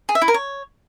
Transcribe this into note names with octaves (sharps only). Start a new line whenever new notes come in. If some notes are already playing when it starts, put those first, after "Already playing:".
G#4
E5
E4
A#4
C#5